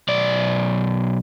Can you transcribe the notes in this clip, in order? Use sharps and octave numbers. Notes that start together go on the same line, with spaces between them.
B1 D5